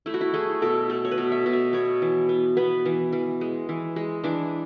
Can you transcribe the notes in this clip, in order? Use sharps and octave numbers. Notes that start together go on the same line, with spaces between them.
A3 E4
F#4
E4
A3 G#4
B2 A4
A3 A4
C#5
B4
B2
E5
B2
E5
B3 C#5
E3
B3
B3 B4
E3
E3
G#3
E3
G#3
E3 D4